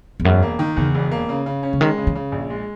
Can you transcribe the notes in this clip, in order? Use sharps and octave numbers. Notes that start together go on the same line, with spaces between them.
E2
E1 F#2
A#3
D#3
E2 C#3
E1
A#3
C#3
C#3
C#4
C#3
D#3 G#3
C#3
E3
C#3
A#1
G#3